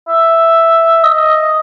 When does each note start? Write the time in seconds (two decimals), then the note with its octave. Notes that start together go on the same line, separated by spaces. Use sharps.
0.08 E5
1.03 D#5